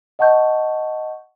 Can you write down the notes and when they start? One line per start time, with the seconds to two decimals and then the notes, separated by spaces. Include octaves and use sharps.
0.19 D#5 F#5 A5 C#6 G6